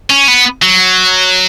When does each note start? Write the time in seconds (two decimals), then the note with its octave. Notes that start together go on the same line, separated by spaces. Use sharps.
0.10 C#4
0.28 B3
0.62 F#3